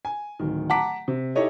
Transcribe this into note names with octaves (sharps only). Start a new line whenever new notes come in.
G#5
D1 D#3
F#5 A5 A#5 D6 B6
C3
D#4 E4 G4 A4 C#5 D#5